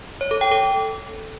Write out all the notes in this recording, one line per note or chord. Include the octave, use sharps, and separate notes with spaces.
C#5
A4
G5
A4